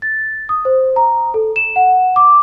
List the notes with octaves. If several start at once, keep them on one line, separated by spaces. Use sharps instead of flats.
A6
D#6
C5
A#5
A4
E7
F#5
D6